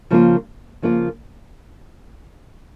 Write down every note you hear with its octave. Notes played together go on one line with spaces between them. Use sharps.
C#3 F3 A#3 F4
C#3 F3 A#3 F4